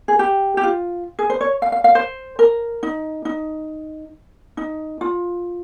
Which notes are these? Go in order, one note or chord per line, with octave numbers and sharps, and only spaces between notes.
G#4
G4
G4
F4
G#4
C5
C#5
F5
F5
F5
C5
A#4
D#4
D#4
D#4
F4